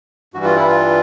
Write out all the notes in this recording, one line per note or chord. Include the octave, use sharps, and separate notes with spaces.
G2 E3 G3 F#4
F4
E4
F4